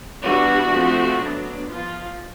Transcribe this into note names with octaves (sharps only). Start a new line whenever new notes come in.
E3 G3 B3 D4 F#4
F3 A3 C4
F#3 B3 D4
F3 F4